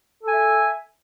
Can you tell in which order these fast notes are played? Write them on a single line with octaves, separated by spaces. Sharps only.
A4 G#5 E5